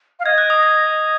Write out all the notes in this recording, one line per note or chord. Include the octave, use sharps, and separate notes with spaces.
F5
D#5 G#6
F#6
D#6
G#6